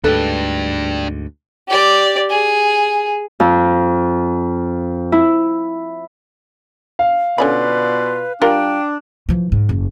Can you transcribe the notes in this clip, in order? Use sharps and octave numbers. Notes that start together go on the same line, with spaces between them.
D2 G#2 D4 G4 A4 B4
G4 D5
G#4
F2
E4
F5
B2 D3 C#4 F4 B4 D5 B5
G3 D4 F4 A#4 G5
E3 F3
G#2
F#1